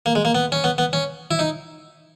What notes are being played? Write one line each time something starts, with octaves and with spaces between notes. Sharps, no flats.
A#3
G#3
A#3
B3
C#4
B3
B3
C#4
E4
D#4